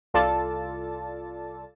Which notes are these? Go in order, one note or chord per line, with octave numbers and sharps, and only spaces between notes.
C2 F4 A4 D5 A5 A6